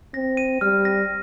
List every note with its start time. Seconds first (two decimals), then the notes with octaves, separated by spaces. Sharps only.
0.14 C4 A#6
0.37 D#7
0.61 G3 F6
0.85 A#6